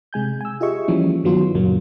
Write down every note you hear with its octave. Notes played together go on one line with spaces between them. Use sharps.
C3 G#3 G#5 G6
G#5 E6
F4 G4 G#4 D#5 E5 C#6
E3 F3 G3 A#3 C#4
G2 D#3 F#3 B3 F4 C6
C#2 F#2 A#2 F#3 A#3